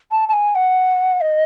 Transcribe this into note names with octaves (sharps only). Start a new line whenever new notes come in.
A5
A5
G#5
F#5
D#5